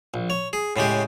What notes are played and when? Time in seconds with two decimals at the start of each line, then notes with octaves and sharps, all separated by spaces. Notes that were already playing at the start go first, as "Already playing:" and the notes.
0.14 A#1
0.30 C#5
0.53 G#4
0.76 A2 C#3 G#3 G4